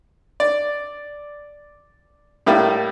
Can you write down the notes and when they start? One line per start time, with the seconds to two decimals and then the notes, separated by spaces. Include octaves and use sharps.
0.40 D5
2.46 A2 G3 A3 A#3